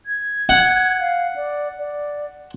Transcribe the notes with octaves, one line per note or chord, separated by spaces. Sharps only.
G#6
F#5
F5
D5
D5